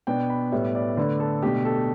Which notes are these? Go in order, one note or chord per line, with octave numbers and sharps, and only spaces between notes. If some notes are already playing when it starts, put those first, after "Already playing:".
B2 B3 D4 G5
B5
A2 G3 B3 E5
D5
D3 A3 D4 B4
A4
B2 A3 D4 G4
A4